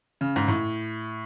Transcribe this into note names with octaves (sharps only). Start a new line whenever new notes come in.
C#3
G#2
A2